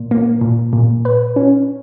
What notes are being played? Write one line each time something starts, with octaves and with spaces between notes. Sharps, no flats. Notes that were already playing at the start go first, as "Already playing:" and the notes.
Already playing: A#2
A#3
A#2
A#2
B4
C#4